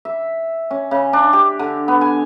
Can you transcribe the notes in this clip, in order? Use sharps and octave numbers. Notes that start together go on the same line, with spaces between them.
E5
C#4
C#3
D4
G4
D3
B3
G#5